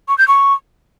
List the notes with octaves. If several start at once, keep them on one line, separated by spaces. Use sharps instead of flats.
C#6
G6
C#6